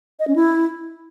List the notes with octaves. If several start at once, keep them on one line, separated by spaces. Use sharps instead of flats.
D#5
C#4
E4